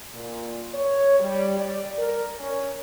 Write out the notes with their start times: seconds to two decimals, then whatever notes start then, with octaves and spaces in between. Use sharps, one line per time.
0.14 A#2
0.74 C#5
1.20 G3
1.60 D5
1.98 A#4
2.40 C#4